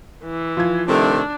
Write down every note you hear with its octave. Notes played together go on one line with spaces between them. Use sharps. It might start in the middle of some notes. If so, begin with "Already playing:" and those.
E3
F3 G#6
C3 D#3 A3 D4